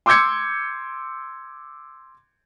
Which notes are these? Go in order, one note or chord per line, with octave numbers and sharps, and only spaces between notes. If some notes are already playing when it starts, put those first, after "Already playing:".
C6 D6 E6 G6 G#6 C#7